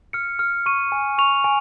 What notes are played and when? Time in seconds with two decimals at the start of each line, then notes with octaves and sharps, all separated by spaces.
0.13 F6 C#7
0.39 F6
0.66 C#6 D#7
0.92 G#5
1.18 C#6 F7
1.44 G#5